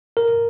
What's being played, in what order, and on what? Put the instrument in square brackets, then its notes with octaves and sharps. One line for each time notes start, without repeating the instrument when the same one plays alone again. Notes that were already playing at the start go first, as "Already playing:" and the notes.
[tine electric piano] A#4